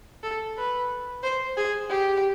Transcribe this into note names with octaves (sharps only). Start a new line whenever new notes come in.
A4
B4
C5
G#4
G4